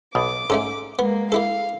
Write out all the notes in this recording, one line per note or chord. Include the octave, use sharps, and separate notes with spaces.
B1 B2 D6
G#2 A3 C#4 A4
G#3 A#3 B3
A#3 E4 A4 F5